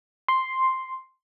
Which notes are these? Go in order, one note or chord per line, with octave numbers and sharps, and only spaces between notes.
C6